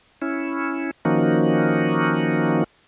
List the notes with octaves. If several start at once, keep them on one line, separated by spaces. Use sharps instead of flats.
C#4 E4
D#3 F3 A#3 C#4 D#4 F#4